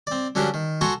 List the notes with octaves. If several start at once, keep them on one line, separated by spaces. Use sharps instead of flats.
C4 D5
D3 F#3 C#4 D4 G4 A#4
D#3
F#4 A4 G#5 A#5 C6 C#6